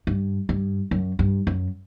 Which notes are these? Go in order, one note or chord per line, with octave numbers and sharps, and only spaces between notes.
G2
G2
F#2
G2
F#2